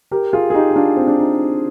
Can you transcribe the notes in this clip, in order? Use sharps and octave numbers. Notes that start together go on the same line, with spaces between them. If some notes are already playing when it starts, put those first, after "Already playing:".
G4 A#4
F4 G#4
G#4
D#4 G4
D#4
D4 F4
C4
D4
D#4